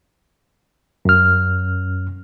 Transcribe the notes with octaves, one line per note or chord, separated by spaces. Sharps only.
F#2 F6